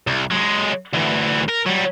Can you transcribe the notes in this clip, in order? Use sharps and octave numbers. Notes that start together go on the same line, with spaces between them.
C2
F#3 G#3
D2 E3
A#4
F#3 G3